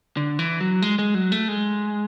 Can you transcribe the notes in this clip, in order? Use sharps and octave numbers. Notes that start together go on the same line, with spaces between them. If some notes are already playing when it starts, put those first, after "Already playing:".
D3
E3
F#3
G#3
G#3
F#3
A3
G#3